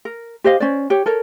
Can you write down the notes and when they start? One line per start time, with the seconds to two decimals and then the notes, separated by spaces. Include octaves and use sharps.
0.05 A#4
0.44 G4 C5 D#5 F5
0.60 C#4 C5 D5
0.90 G4 C#5
1.06 A4 A#4 C#5